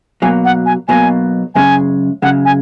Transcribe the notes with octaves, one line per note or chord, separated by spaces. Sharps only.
B1 B2 F#3 A#3 G#5
F#5
G#5
B1 B2 F#3 A#3 G#5
F#2 C#3 G#3 G#5
F#2 C#3 G#3 F#5
G#5